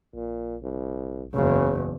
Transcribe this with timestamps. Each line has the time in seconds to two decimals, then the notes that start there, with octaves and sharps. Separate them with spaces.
0.14 A#1 A#2
0.62 C2
1.34 F#1 E2 C#3